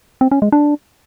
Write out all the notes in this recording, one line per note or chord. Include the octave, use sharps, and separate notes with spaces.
C4
C#4
G#3
D4